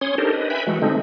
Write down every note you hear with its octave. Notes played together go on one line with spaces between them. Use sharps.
C#4 C#5 C6 D#6
D4 D#4 G4 A4 A#4 C5
B4 D#5
B4 E5 G5 G#5 B5
E3 G#3 A3 F#4
D3 G#3 A3 C4 D#4